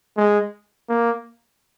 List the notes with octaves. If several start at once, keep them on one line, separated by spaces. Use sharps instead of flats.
G#3
A#3